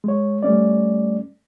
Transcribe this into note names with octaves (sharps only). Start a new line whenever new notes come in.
G#3 C#5
G3 A3 C#4 D5